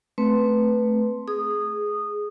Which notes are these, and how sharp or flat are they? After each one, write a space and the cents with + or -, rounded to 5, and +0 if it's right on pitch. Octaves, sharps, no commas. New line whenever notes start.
A3 +0 C4 +0 B4 +0
G#4 +5 D#6 -15